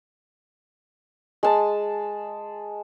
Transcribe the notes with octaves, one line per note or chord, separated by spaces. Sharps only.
G#3 A5